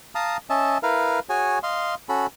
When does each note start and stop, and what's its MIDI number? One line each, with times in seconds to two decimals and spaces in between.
0.15 0.37 77
0.15 0.37 81
0.15 0.37 82
0.15 0.37 87
0.50 0.78 61
0.50 0.78 75
0.50 0.78 76
0.50 0.78 81
0.83 1.20 64
0.83 1.20 70
0.83 1.20 71
0.83 1.20 77
1.29 1.59 66
1.29 1.59 68
1.29 1.59 73
1.29 1.59 80
1.63 1.95 75
1.63 1.95 77
1.63 1.95 84
2.09 2.27 61
2.09 2.27 66
2.09 2.27 69
2.09 2.27 83